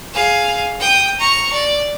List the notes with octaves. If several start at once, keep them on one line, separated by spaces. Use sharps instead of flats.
G#4 F5
G5 D#6
A#5 C#6
D5